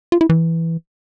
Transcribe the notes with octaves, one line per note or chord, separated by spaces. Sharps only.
F4
E4
E3